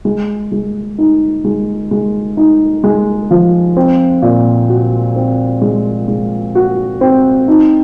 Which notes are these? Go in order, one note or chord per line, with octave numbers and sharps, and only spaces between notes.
G#3
G#3
D#4
G#3
G#3
D#4
G#3
F3
C4
A#2
F#4
C4
G#3
G#3
F#4
C4
D#4